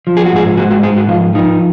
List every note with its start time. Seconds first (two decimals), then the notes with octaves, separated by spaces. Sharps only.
0.07 F3
0.17 G#4
0.26 F#4
0.32 G#2 G#4
0.57 G#3 F#4
0.70 F#4
0.83 G#2 G#4
0.97 F#4
1.09 F3 F4
1.34 F3 D#4